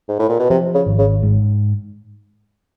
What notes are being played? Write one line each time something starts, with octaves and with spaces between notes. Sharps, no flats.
G#2
A2
A#2
B2
C3 F3
C#3
G#1
C#3
G#2